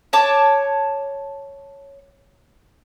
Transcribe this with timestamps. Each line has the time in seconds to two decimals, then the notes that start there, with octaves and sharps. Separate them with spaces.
0.13 C#5 A5 D6